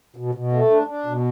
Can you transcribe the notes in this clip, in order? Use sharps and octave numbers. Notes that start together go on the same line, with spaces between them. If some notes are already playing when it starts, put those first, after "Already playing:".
B2
B2
A3
D4
D4
B2